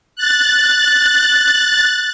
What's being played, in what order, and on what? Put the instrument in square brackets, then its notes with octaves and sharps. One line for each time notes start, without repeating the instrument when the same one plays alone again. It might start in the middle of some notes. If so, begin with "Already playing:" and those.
[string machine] F#6 A6